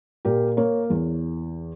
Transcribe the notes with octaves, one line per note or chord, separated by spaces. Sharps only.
A#2 G4 A#4
A#3 A#4 C#5
E2